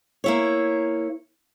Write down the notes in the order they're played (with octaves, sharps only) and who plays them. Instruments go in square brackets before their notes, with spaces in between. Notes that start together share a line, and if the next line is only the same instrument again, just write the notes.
[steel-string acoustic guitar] A#3 E4 C#5